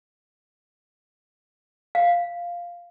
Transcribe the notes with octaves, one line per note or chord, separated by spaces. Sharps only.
F5